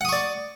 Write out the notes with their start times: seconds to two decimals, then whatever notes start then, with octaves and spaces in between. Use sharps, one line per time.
0.01 F#5
0.05 D#6
0.09 C#6
0.13 D5